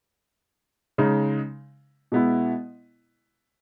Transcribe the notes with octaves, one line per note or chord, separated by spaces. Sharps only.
C#3 G#3 D#4
B2 G#3 B3 E4